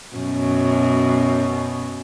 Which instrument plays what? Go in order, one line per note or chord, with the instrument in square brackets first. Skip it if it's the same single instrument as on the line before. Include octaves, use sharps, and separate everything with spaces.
[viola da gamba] F#2 B2